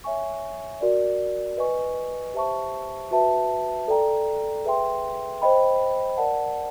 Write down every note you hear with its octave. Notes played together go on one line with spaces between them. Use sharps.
C#5 E5 G#5 C#6
F#4 A#4 D5
B4 D#5 G#5 C#6
G4 C5 E5 A5 C#6
F#4 B4 E5 A5
A4 D5 G5 A#5
G#4 B4 E5 G5 C6
C5 D#5 G5 B5
A#4 D5 F#5 A5